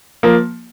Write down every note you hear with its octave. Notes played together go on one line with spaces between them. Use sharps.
F3 A#3